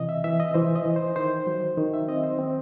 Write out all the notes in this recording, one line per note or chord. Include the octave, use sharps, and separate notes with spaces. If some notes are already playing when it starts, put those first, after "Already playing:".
Already playing: C3 E3 D#5
E5
E3 E5
D#5
E3 C5
D#5
E3
C5
D#3 C5
F#3
D#3
E5
C4 D#5
C5
C4